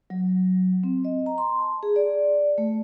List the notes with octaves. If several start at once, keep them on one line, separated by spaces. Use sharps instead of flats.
F#3
C4
D#5
A#5
C6
A5
G#4
D5
A3